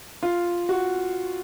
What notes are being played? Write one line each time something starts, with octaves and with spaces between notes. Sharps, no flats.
F4
F#4